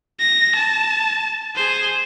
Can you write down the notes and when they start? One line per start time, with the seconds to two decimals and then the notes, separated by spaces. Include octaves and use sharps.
0.20 A#6
0.55 A5
1.56 G#4 C5